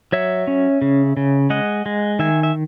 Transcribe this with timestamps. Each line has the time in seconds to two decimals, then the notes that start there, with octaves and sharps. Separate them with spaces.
0.12 F#3 C#5 E5
0.47 C#4
0.82 C#3
1.17 C#3
1.50 G#3 D#5 F#5
1.86 G#3
2.19 D#3 E5 G#5
2.43 E5